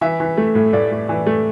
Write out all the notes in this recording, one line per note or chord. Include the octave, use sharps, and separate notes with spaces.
E3 E5
E3
A3
A2
A2 D5
A2
E3
A3